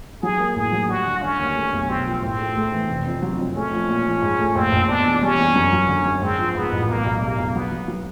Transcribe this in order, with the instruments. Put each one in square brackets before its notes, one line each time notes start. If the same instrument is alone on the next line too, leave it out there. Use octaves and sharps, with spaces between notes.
[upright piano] F#3 [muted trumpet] G#4
[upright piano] A#3
[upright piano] A2 [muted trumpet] G#4
[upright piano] F#3
[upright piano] G3 [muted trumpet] F#4
[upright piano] D3
[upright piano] D3 [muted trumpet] C#4
[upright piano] D#2
A3
B1
[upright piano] B1 [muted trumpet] C4
[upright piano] F3
[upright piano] A2 [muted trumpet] C4
[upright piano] A3
A3
E3
F1
F2
F#3
F2
[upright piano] A3 [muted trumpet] C#4
[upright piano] F3
A#2
F3
G#2
A3
[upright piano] A#1 [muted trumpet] C4
[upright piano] A#1
[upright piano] B2 [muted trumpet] D4
[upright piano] E2
[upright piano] G3 [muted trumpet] C#4
[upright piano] E2
F#2
F#3
D3
F#2
[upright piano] G#2 [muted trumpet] C4
[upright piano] F3
[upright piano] G#2 [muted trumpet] B3
[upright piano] A1
[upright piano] B1 [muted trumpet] A#3
[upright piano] B1
[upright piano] G3 [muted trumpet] A#3
[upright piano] B1
[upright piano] F#3 [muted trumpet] B3
[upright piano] F#3
F#3